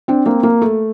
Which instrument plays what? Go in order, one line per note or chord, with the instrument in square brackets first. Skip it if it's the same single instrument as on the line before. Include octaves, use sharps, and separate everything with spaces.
[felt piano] C4 D4
A#3 C4
A#3
A3